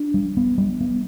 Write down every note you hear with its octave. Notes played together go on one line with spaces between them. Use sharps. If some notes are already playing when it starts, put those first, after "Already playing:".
Already playing: D4
G3
B3
G3
B3